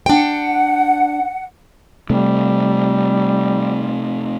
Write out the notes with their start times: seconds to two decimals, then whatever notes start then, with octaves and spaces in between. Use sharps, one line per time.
0.06 D4 F#5 G5
2.10 C3 G3 A3